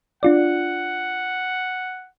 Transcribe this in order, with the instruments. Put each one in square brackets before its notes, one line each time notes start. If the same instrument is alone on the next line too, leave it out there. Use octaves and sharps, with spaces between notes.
[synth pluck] D4 F4 D5 [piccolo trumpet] F#5